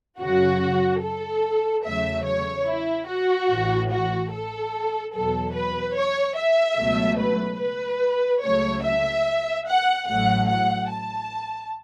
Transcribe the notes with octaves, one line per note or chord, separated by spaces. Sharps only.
F#2 C#3 F#3 F#4
A4
E2 C#3 F#3 A3 E5
C#5
E4
F#4
A1 A2 E3
F#4
A4
E2 B2 F#3 A4
B4
C#5
E5
C#2 B2 F#3 A3
B4
B4
C#2 C#3 F#3 A3 C#5
E5
F#5
A1 A2 F#3 A3 F#5
F#5
A5